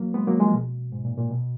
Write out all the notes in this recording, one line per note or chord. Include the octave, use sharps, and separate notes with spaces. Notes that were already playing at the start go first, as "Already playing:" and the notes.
Already playing: F#3 A#3
G#3 B3
F#3 A#3
F3 G#3
B2
G#2
A#2
A#2
B2